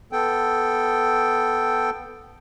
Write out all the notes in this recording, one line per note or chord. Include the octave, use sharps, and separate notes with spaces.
B3 A4 G5